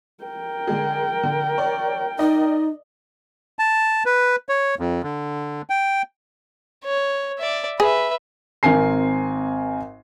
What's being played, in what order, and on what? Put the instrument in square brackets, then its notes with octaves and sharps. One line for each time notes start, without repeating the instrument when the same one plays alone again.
[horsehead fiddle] A#4 G5
[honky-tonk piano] D3 G#3 G#4
D3
C#5 D5
[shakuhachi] D#4 [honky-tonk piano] D5 D#5
[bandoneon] A5
B4
C#5
F2
D3
G5
[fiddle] C#5
D5 E5
[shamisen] G#4 [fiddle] B4 E5
[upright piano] G#1 C4 A#4 G#5 C7